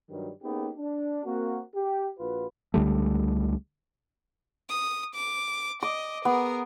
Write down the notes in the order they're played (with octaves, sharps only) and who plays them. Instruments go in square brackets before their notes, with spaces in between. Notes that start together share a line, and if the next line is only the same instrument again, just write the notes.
[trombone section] G2 D#3 F#3 G3
A#3 B3 C#4 D#4 G4 G#4
D4
A#3 C4 F#4
G4
A#1 F4 F#4 B4
[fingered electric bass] C#2 D3 G3 A3
[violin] D#6
D6
[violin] D#5 [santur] D6
[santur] B3 [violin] G#4 A#4